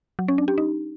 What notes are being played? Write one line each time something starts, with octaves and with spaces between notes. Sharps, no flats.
F#3
C#4
D4
G4
D#4